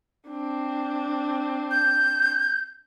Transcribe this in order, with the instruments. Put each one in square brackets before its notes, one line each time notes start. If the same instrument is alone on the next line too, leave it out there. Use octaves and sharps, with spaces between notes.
[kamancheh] C4 D4
[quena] G6